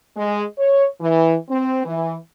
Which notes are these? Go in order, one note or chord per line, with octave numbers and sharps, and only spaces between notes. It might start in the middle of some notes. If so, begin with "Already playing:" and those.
G#3
C#5
E3
C4
E3